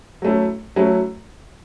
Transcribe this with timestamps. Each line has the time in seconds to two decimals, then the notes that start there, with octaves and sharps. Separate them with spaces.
0.22 F#3 A3 C#4 E4
0.76 F#3 A3 C#4 E4